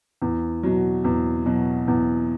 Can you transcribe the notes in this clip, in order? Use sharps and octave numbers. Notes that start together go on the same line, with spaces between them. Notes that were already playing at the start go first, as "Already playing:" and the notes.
E2
B2 F#3
E2
B2 F#3
E2